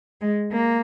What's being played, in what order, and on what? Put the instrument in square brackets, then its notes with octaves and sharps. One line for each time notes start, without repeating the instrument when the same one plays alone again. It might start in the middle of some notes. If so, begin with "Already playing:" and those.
[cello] G#3
A#3